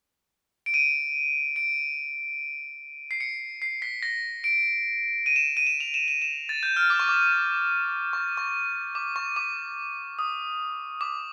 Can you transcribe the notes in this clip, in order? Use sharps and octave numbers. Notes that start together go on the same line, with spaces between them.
D7
D#7
D7
C7
C#7
C7
B6
A#6
D7
D#7
E7
D#7
E7
F7
E7
E7
E7
A6
G6
F6
D6
C#6
D6
C#6
C#6
D6
C#6
D6
D#6
D6